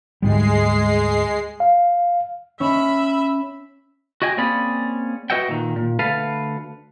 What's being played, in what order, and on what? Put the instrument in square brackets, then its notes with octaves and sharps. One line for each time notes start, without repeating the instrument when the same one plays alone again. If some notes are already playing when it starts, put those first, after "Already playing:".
[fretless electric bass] D2 G#2 G3 [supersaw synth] G#3 C7
[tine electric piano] F5
[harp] C#4 [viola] E5 B5
[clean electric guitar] F#4 D#5 G5 G#5
A#3 C4 C#4 G#4 D5 B5
F#4 B4 D#5 E5 F#5 G5
A#2 D#3
A#2
D2 A4 B4 F5